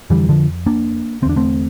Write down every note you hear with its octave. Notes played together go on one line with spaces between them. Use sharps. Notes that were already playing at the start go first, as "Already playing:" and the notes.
F2 D3 E3 G3
D3 F3
A#3 D4
E2 D3 C4 D4
A3 C4